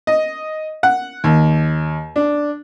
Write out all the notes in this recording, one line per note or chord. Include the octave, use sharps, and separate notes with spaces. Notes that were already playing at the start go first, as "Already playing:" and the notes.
D#5
F#5
D#2
D4